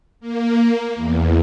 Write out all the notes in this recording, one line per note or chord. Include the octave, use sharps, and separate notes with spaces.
A#3
E2